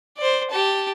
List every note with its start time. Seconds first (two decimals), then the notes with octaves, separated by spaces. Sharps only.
0.17 C5 D5
0.51 G4 A5